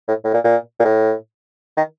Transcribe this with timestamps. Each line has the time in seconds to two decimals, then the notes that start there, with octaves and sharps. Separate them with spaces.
0.08 A2
0.24 A2
0.34 A#2
0.44 A#2
0.79 A#2
0.85 A2
1.77 D#3